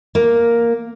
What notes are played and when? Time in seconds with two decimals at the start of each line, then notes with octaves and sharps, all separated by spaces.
0.15 A#3